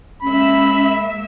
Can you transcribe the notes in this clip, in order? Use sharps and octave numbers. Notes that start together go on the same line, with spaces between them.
G#3 A#3 C#4 E5 B5